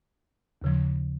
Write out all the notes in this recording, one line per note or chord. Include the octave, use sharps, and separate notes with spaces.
D#2 C#3 F3